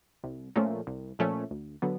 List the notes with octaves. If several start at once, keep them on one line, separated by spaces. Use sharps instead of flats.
C2
A#2 F3 A3 C#4
C2
A#2 F3 A3 C#4
D2
D3 F#3 B3